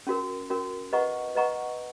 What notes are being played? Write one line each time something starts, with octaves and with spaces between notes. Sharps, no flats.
C#4 F#4 A#4
C#4 F#4 A#4
B4 D#5 F#5 A#5 C#6
B4 D#5 F#5 A#5 C#6